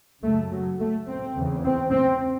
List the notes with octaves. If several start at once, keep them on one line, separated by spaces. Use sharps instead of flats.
F#2 C#3 A3
F#3
A3
C4
E2 C#3
C4
C4